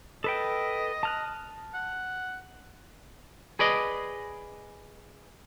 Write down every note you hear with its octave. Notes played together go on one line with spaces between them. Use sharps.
A4 B4 D#5 G5
A5 F6 F#6
F#5
G#4 B4 D5 D#5